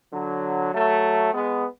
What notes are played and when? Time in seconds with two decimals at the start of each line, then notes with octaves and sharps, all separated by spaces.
0.13 D3 F#3
0.74 F#3 A3
1.34 G#3 B3